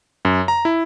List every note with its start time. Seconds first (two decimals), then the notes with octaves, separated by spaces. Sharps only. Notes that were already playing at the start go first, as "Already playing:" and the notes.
0.25 F#2
0.48 A#5
0.65 E4